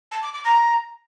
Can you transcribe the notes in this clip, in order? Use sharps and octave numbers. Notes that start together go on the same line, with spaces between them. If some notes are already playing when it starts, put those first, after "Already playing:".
A5
D6
D6
A#5